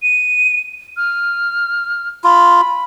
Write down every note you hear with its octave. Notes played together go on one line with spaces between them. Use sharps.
D#7
F6
F4 B5